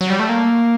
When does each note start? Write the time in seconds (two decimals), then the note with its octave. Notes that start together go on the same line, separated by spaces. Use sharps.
0.01 F#3
0.10 G3
0.19 A3
0.29 A#3